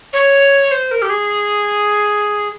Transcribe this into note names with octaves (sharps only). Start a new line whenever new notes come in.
C#5
C5
A#4
G4
G#4